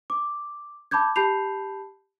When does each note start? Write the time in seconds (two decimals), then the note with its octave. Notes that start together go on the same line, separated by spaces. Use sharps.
0.10 D6
0.91 A5 B5 D6 G6 G#6
1.16 G4 A5 B5 G6 C7 F7